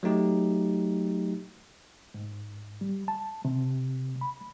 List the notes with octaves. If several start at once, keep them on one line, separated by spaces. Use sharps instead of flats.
F#3 A3 D#4 G4
G#2
G3
A5
C3
B5